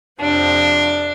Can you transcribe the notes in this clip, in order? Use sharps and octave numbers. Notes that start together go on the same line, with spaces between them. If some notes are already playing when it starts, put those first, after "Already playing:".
F2 C3 F3 D4